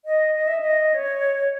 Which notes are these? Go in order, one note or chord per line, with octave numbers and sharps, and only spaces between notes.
D#5
D#5
E5
D#5
C#5